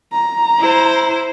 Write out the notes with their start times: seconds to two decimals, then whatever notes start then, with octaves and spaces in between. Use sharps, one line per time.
0.13 A#5
0.59 E4 C5